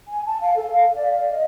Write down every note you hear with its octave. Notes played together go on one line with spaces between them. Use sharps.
G#5
A5
F5
A4
F5
D5
F5
D#5